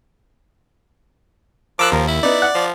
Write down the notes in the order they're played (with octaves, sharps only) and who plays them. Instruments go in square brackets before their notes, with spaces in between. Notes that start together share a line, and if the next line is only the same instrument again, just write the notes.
[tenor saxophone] F3 [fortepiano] A#4 [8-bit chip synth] D6 E6 F#6
[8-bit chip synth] D#2 [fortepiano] A#4
[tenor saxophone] E4
[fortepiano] B3 D#4 [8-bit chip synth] D5
[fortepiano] F#5
[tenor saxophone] F3